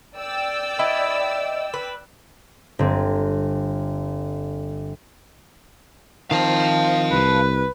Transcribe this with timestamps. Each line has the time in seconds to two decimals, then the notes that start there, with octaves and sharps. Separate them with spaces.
0.17 D5 G5 E6
0.79 E4 B4 D#5
1.74 B4
2.79 G1 C4
6.31 D#3 F3 C4 F5 A5
7.11 C2 B4